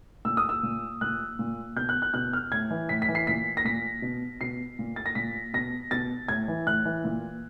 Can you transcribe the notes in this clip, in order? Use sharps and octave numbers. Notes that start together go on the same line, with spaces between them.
A#2 E6
D#6
E6
A#2
A#2 F#6
A#2
B2 G6
F#6
F#6
B2 F#6
F6
A2 G#6
E3
A2 B6
B6
E3
C7
A#2 B6
A#6
A#2 B6
B2
B2 C7
A#2
A6
A#6
A#2 B6
B2 A#6
B2 A6
A2 G#6
E3
A2 F#6
E3
A#2